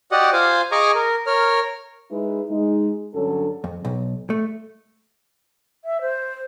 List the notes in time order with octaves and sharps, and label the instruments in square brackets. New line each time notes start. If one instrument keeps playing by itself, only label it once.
[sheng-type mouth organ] F#4 G4 D5 D#5 F#5
F4 C5 F5 G#5
G#4 D#5 G#5 A#5 C#6 D6
A#4
A#4 C#5 F6
[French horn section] G#3 D#4 E4 B4
G#3 D#4
G2 D3 F#3 C#4 A4
[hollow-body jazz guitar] F2
B1
A3
[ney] E5
C5